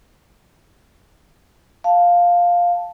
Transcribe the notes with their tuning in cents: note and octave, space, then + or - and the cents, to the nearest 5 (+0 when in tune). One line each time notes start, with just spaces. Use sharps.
F5 +5 A5 +0